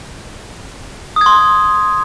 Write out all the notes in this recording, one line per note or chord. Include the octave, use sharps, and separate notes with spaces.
C6 D#6 G#6